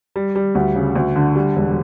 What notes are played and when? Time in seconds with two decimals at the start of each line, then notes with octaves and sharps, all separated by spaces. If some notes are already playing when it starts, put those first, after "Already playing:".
0.16 G3
0.36 G3
0.55 D2
0.75 C#3
0.96 D2
1.16 D3
1.36 G3
1.56 E1